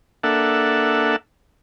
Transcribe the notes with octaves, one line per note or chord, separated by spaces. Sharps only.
A#3 D4 A4 E5 F#5